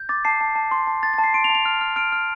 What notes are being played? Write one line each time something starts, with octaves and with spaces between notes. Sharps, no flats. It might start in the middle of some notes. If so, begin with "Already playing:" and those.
Already playing: G6
D6 A6
A5 C7
A5
A5
C6
A5
A5 A6
A5 A6
C7
C6 D7
F7
A5
F7
F6
F6
F6 D7
F6